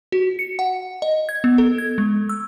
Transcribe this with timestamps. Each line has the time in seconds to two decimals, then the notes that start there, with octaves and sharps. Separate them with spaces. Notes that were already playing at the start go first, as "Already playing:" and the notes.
0.12 F#4
0.39 C#7
0.59 F#5
1.02 D#5
1.29 G#6
1.44 B3
1.58 A4
1.78 G#6
1.98 G#3
2.29 E6